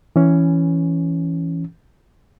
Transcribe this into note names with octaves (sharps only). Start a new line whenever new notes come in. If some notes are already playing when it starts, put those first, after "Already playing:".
E3 C#4